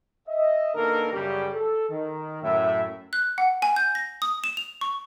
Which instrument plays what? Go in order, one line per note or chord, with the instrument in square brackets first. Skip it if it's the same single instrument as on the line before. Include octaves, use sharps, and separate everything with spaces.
[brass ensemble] D#5 E5
B2 D#3 A#3 D4 A4 A#4
F#2 C#3 G3 G4
A4
D#3
F#2 A2 E5
[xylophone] F#6
F#5
G#5
G6
A#6
D#6
E7
F7
C#6